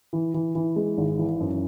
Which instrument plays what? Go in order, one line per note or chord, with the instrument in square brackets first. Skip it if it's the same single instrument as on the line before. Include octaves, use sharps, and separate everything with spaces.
[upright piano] E3
E3
E3
G#3
G#1
E3
F#2